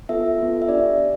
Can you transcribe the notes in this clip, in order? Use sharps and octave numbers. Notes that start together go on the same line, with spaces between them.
B3 F4 A4 E5
B3 F4 A4
E5
D4 G4 D5
D4